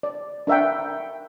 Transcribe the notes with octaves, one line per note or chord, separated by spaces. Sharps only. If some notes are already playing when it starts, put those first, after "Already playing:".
D5
D4 A#4 E5 F#5 G5